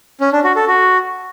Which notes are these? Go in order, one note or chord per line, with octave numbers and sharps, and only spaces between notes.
C#4
D4
F#4
A4
F#4